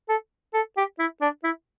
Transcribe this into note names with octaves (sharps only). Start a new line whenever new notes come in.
A4
A4
G4
E4
D4
E4